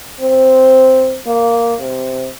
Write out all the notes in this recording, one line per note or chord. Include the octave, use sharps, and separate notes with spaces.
C4
A#3
C3